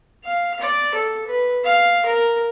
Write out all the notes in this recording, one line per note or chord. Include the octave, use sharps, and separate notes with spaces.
F5
D5
A4
B4
F5
A#4